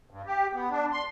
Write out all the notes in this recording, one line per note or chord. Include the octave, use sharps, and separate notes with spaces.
G2
G4
B3
D4
C6